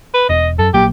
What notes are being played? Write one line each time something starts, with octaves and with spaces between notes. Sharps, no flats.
B4
E1 D#5
F#2 A4
A#1 F#3 A#3 G4